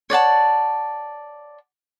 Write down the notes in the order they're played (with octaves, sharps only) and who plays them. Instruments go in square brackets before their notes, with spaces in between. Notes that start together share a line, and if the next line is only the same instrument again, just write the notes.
[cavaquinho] C#5 D5 F#5 A5